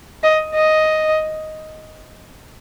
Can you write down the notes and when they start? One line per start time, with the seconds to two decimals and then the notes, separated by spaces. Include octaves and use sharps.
0.23 D#5
0.55 D#5